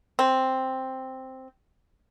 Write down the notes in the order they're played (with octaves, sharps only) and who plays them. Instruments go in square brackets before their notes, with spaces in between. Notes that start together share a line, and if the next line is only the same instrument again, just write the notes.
[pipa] C4